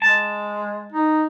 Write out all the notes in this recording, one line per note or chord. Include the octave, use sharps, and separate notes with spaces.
G#3 A5
D#4